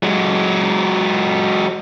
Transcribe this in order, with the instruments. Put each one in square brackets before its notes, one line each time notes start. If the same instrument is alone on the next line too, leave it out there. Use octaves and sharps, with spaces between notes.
[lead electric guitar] F#3 G#3